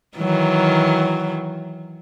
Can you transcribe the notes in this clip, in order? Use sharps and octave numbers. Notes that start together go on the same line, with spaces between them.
D#3 E3 F#3